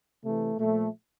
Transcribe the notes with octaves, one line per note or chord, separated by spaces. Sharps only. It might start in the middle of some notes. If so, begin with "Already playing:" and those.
C3 E3 A3
A#2 F3 A3